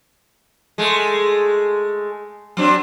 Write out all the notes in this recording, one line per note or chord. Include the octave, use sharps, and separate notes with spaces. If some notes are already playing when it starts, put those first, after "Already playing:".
G#3 A3
F#3 C4 D4